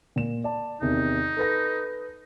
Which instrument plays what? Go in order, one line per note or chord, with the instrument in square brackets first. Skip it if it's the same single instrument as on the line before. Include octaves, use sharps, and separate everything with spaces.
[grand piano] A#2 E7
D5 A5
[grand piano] E2 C3 D#3 [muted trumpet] D#4
[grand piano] A4 B4 A#6